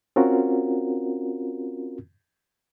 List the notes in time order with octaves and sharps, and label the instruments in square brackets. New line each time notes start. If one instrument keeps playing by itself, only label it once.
[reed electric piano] C4 C#4 F4 F#4 A#4